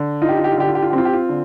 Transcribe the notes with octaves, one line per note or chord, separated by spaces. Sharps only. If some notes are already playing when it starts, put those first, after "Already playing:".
Already playing: D3
D#4 F4
G4
F4
G4
F4
D3 G4
F4
G4
F4
G4
C4
F4
G4
F4
D3